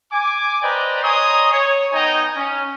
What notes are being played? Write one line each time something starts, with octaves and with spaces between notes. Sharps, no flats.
G#5 D6
B4 C5 D5 D#5 G5 A#5
C#5 D#5 G#5 A#5 C6 D#6
C#5
B3 D#4 D#5 G5 G#5 A#5
C#4